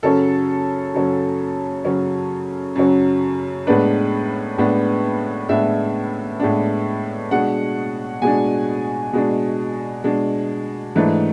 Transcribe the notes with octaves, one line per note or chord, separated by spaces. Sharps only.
F#2 C#3 F#3 C#4 A4
F#2 C#3 F#3 C#4
F#2 C#3 F#3 C#4
F#2 C#3 F#3 C#4
A2 G#3 B3 D4 B4
A2 G#3 B3 D4
A2 G#3 B3 D4 E5
A2 G#3 B3 D4
B2 G#3 D4 F#5
B2 G#3 D4 G#5
B2 G#3 D4
B2 G#3 D4
G#2 E3 A3 D4